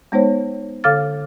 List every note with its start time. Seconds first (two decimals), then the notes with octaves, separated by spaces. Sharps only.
0.12 G#3 B3 D#4 C5 C#5
0.84 D3 A4 F5 D6 F6 A6